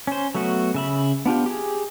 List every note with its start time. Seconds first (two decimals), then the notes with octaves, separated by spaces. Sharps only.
0.07 C#4 C5
0.35 F#3 A3 B3 F#4
0.74 C#3 E5 B5
1.26 B3 D4 F4 G4
1.46 G4 G#4